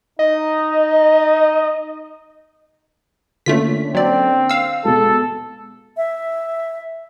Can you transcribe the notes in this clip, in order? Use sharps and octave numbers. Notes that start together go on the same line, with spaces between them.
D#4 D#5
D3 A3 A#3 C#4 F4 B6
F#3 C4 D5
F5 E6
B2 G#3 A4
E5